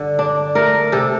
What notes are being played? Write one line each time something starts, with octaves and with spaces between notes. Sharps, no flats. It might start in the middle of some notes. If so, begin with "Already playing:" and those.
Already playing: G2 D3
D4
A3 A#4
C3 A4